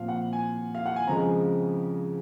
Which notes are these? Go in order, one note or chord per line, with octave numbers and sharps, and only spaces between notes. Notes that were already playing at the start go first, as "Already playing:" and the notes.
Already playing: A#2 F3 C4 F5
F#5
G#5
F5
F#5
G#5
F2 C#3 F3 G#3 A#5